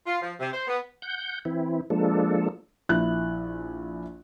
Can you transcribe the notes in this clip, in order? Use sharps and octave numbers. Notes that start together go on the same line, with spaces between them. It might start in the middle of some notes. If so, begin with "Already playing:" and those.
F4
F3
C3
C5
B3
F#5 G6
E3 C4 E4
F3 G#3 A#3 D4 A4
A#1 E4 F#6